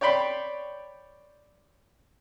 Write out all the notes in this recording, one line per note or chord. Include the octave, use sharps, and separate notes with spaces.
C#5 D5 G5 B5 C6